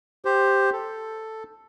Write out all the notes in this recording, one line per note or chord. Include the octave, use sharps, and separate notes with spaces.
G4 C5
A4